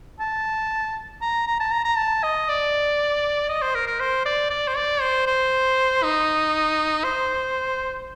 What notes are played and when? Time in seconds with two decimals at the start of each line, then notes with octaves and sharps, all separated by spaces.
0.20 A5
1.21 A#5
1.47 A#5
1.60 A5
1.72 A#5
1.85 A#5
1.97 A5
2.23 D#5
2.48 D5
3.49 D#5
3.62 C5
3.75 A#4
3.87 A#4
4.00 C5
4.25 D5
4.50 D5
4.68 C5
4.77 D5
5.01 C5
5.27 C5
6.03 D#4
7.04 C5